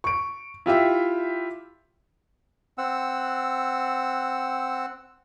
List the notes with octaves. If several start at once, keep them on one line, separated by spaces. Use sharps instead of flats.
C#6 D7
E4 F4 G4 E5
C4 F#5 E6